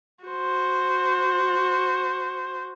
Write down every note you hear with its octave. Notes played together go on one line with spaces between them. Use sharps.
F#4 C5